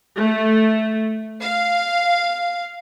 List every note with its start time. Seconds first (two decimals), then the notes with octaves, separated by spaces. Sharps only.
0.18 A3
1.41 F5